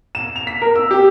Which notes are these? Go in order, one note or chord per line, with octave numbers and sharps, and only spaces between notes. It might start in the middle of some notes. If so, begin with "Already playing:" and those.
E7
F7
B6
A#4
E6
G4